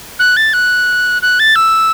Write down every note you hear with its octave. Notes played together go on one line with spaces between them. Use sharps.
F#6
A6
F#6
F#6
A6
E6